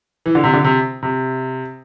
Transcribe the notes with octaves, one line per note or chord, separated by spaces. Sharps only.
E3
D3
C3
D3
C3
C3